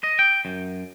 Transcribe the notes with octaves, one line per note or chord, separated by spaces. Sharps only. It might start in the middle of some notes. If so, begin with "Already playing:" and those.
D#5
G5
F#2